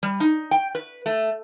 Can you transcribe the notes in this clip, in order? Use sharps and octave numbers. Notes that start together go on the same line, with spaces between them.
G3
D#4
G5
B4
A3